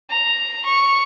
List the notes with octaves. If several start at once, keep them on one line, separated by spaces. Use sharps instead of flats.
A#5
C#6